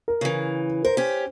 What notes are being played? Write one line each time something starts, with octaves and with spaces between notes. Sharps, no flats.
A#4
C#3 E3
A#4 C5
C#4 G4